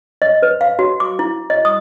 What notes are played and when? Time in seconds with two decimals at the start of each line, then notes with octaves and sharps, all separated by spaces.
0.22 D#5
0.43 B4
0.61 F5
0.79 F#4
1.00 D6
1.19 E4
1.50 D#5
1.65 D#6